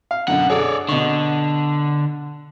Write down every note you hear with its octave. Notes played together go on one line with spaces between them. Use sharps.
F5
F#2 B2 D3 F#5
G#4 A4 C#5 D5
B2 D3 C#6